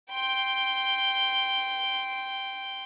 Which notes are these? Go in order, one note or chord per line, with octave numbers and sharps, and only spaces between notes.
G5 C6